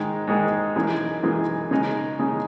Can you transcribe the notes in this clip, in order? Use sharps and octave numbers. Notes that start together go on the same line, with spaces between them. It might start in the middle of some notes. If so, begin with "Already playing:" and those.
Already playing: G#2 D#3 G#3 D#4
G#2 D#3 G#3 D#4
F#2 E3 G#3 D#4 G#4
F#2 E3 G#3 D#4 G#4
C#3 G#3 D#4
C#3 G#3 D#4